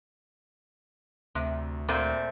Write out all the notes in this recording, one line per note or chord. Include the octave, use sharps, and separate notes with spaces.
D2 C3
A#2 A3 C4